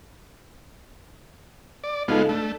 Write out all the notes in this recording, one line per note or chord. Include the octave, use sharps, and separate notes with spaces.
D5
C#3 G#3 B3 D#4 F4 A4
A3 D4